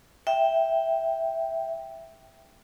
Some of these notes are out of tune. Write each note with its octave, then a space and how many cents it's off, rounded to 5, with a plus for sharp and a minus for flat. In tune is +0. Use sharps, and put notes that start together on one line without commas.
E5 +0 G5 +0